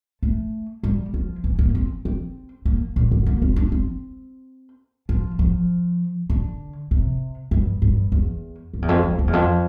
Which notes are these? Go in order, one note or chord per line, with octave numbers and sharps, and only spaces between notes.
A3
G3
F3
E3
A#3
C4
C4
A#3
A#2
D3
A#3
C4
D4
C4
F3
F3
D3
C3
G2
G2
E2
F2
E2
F2
F2
F2
E2
F2